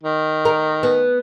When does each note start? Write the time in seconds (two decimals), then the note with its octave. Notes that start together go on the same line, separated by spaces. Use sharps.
0.03 D#3
0.45 A#4
0.83 B3